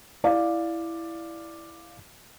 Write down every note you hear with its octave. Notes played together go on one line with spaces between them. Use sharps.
E4 D5 F5